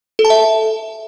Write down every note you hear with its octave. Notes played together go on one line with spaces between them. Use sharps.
A4
A5
E5